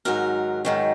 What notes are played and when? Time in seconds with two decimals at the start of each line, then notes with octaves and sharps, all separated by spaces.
0.05 G#2 D#3 F#3 A#4
0.65 G#2 D#3 F#3